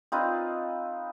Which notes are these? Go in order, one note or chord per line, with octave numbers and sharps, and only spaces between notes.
C4 D#4 F4 B4